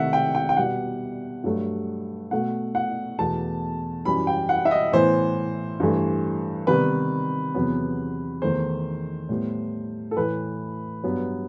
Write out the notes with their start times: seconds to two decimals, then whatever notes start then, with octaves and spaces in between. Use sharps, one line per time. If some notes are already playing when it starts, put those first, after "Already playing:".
Already playing: C3 D#3 A3 E5 F#5
0.13 G5
0.35 G5
0.49 G5
0.57 B2 G3 B3 F#5
1.44 G2 F#3 A3
2.31 B2 A3 F#5
2.75 F#5
3.19 E2 B2 A3 A5
4.05 F#2 E3 G3 B5
4.27 G5
4.49 F#5
4.65 E5
4.71 D#5
4.92 A2 E3 B3 C5
5.80 G2 E3 A3
6.67 C3 D#3 G3 B3 B4
7.54 E2 C3 F#3 B3
8.42 E2 D#3 A3 C5
9.29 A2 G3 B3
10.11 A4
10.16 A2 E3 A3 B4
11.04 G2 F#3 B3